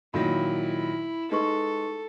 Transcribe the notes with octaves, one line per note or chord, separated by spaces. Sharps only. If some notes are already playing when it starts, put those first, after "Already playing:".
A#2 D#3 F#3 E4 B5
G#3 D#4 A4 B4 C#6